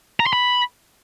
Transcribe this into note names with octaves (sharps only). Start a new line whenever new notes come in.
A#5
C6
B5